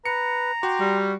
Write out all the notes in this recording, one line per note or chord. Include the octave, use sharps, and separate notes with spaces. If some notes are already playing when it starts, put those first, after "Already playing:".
B4 A#5 C#7
F#4 G5 C6 D6
G3